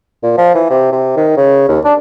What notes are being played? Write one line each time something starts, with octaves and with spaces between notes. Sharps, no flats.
A#2
F3
E3
C3
C3
D#3
C#3
D#2
D4